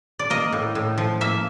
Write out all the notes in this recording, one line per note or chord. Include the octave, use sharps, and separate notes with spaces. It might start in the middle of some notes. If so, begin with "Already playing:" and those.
D5
A#3 D#5
A2
A2
F3
A#3 E5